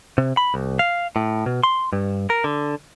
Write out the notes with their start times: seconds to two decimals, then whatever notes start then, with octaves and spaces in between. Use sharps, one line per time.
0.18 C3
0.37 B5
0.54 C2
0.79 F5
1.16 A2
1.46 B2
1.64 C6
1.93 G2
2.30 A#4
2.44 D3